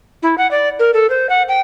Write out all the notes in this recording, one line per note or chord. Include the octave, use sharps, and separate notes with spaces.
E4
F#5
D5
A#4
A4
C5
F#5
G5